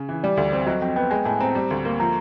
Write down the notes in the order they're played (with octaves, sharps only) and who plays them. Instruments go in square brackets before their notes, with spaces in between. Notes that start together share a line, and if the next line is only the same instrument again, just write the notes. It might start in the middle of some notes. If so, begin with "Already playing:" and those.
Already playing: [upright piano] C#3
E3
[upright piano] G3 [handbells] D5
[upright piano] D2
C4
[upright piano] F#3 [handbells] D#5
[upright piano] F2 [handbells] G5
[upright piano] B3 [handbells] G5
[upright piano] G#3 [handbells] G#5
[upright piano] A2 [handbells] A5
[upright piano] C4 [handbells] A#5
[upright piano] G3
D2
A#3
[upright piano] F3 [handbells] A#5